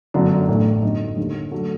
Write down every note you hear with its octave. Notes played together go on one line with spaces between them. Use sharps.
G1 F#2 D3 F#3 D4
A1 A2 A3
G1 F#2 D3 D#4
D#2 D3 G3
D3 F#3 A3 F#4